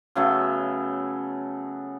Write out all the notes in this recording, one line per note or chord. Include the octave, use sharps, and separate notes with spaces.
C#3 F#3 A3 B3